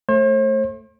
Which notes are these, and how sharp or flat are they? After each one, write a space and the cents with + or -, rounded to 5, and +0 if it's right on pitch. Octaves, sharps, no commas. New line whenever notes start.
A3 +0 C5 +45